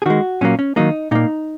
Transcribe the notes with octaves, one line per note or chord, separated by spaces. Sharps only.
G#4
D#3 G#3 F#4
A#2 F#3 A#3 C#4
C#4
D#3 F#3 A#3 D#4
A#2 A#3 D#4